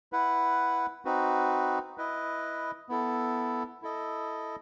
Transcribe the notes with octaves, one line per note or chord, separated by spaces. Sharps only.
E4 B4 F#5
C4 D#4 F#4 B4
E4 B4 D#5
B3 E4 A4
E4 A4 D#5